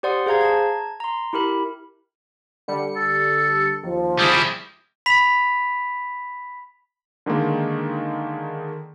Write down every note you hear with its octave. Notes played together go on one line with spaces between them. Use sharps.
G4 C5 D5 F#5 C6 D#6
G#4 C5 F5 A#5 G#6
A5 A#5 G#6
A#5 C6
E4 G4 A#4 B5
D3 G3 C#7
A4
D#2 F3
G3 E4 G#4
B5 B6 F7
D3 D#3 G#3 A#3